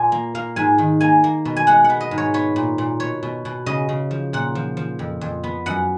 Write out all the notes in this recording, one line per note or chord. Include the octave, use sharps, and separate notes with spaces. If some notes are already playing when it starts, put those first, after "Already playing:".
Already playing: A#2 G#5
A#3
A#3 F5
G#2 G#5
D#3
A#3 G#5
A#3
B2
G#5
G#3 F#5
F#5
B3
D#5
G#2
C#5
B3 C#5
A#2
A#2
B2 C#5
B2
B2
C#3 D#5
C#3
F3
A#2 F#5
F3
F3
F2
F2
B3
F#2 F#5